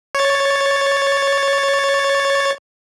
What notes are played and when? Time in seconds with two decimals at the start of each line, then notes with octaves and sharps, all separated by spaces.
0.15 C#5 A6